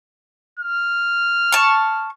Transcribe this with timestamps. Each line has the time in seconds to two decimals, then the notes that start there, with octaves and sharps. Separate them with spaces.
0.60 F6
1.52 A5 C#6